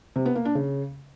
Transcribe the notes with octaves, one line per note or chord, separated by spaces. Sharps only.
C3
B3
A#3
D4
C#3